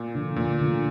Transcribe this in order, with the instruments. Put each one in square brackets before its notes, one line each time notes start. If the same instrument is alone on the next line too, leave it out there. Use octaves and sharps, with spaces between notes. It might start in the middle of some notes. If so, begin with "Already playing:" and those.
Already playing: [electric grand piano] A#2
[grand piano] D3 F3
[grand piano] D2 [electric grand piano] A#2
[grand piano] D3 F3